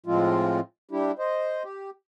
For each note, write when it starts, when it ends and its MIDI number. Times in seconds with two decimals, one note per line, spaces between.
0.06 0.60 45
0.06 0.60 53
0.06 0.60 56
0.06 0.60 60
0.06 0.60 65
0.91 1.12 55
0.91 1.12 62
0.91 1.12 64
0.91 1.12 67
1.19 1.63 72
1.19 1.63 75
1.64 1.90 67